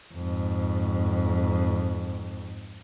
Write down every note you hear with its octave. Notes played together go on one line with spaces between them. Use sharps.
F2 G#2